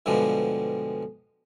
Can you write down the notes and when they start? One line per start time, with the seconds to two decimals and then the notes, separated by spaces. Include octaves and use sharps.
0.06 G2 B2 D3 F3 G3 G#3